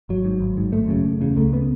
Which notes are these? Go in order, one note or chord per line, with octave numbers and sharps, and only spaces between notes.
G#1 F#3
G#2
G#1
G#2
G#1 A3
F#2 C#3
F#1
E2 C#3
C#2 A3
C#3 B3